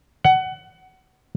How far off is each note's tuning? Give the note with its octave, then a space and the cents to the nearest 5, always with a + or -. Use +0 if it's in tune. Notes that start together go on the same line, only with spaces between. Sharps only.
F#5 +20